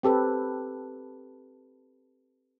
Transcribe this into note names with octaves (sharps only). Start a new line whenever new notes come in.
C4 G4 A4 B4